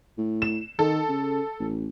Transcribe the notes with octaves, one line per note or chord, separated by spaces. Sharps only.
A2
E7
D#3 A4
C#3
A1